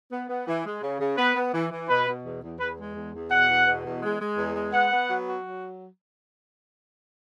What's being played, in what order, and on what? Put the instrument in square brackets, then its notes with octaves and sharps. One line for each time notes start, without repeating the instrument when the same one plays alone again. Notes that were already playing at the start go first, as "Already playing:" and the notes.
[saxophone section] B3
B3
E3
G#3
C#3
C#3
[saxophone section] B3 [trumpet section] B4
[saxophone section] B3
E3
E3
[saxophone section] B2 [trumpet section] B4
[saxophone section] B2
E2
E2
[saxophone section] E2 [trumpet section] B4
[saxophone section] G#3
E2
E2
[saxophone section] B2 [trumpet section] F#5
[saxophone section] E2
B2
E2
G#3
G#3
E2
G#3
[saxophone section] B3 [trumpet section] F#5
[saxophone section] B3
F#3
F#4
F#3